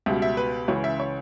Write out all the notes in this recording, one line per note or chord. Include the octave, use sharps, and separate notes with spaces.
C#2 B2 G3 E5
E5
B4
C#2 C#3 E3 C#5
E5
C#5